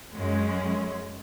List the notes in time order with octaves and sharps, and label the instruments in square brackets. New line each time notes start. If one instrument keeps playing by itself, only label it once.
[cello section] F#2 G#3 C#4